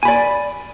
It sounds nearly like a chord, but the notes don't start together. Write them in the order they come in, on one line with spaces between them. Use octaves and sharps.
G#5 B5 D5